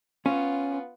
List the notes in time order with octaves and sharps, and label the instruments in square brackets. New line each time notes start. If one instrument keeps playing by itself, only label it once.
[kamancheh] B3 F4 [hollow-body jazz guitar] C#4